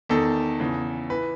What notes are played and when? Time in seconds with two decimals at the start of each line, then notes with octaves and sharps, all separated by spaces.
0.09 E2 D#3 A4
0.60 E2 C#3 E3
1.10 E3 B4